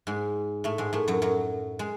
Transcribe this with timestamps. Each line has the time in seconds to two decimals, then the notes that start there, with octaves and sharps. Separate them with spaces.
0.07 G#2 G#3
0.64 A2 A3
0.78 G#2 G#3
0.93 A2 A3
1.08 F#2 F#3
1.22 F#2 F#3
1.79 G#3